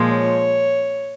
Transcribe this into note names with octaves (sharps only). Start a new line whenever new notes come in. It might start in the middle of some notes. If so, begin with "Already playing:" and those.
Already playing: A#2 F3 G#3
C#5